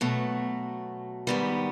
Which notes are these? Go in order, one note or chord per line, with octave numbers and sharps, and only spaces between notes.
B2 F#3 A3
G#2 D#3 G3 B3